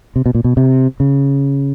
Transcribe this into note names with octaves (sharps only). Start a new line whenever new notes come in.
C3
B2
A#2
B2
C3
C#3